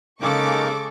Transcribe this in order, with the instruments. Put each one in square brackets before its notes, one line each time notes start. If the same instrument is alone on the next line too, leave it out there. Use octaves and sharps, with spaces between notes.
[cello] C#3 [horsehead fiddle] G#3 A4 [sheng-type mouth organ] A#3 D#4 A#4 [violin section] C#6 D6